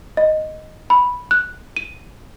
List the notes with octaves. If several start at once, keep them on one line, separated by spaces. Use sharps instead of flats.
D#5
B5
F#6
D#7